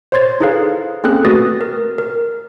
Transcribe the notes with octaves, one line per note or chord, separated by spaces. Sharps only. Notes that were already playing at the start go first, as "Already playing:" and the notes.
C5 C#5 C6 G#6 A6
D#4 E4 G#4 A4 B4 F5
A#3 C4 C#4 G#4 A4 F#6
A3 F#4 B4 D#6 A6 A#6
A#4
A#4